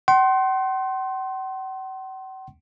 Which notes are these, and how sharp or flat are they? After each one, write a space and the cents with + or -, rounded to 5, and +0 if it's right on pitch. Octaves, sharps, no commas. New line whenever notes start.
F#5 +45 C6 +15